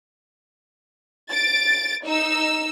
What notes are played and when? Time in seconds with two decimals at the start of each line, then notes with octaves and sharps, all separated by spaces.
1.31 A6 D7
2.07 D#4 E6